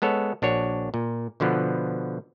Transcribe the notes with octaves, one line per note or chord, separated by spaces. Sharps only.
G#3 B3 A4 C#5
A#1 D4 F#4 C#5
A#2
B2 D3 F3 B3